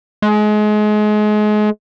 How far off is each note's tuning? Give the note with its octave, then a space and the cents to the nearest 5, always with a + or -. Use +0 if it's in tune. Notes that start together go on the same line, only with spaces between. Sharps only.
G#3 +30